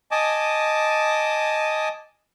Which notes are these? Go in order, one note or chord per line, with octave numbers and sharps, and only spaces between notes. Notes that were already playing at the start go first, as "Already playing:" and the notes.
D#5 G#5 A5 D6 D#6